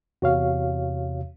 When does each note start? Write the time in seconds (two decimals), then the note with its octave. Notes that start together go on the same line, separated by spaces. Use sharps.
0.22 E2 C3 F#4 C#5 F5